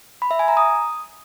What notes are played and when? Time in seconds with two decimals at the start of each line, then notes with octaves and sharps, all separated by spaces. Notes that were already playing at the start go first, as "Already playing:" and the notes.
0.22 B5
0.31 E5
0.39 G#5
0.48 A#5
0.57 D#6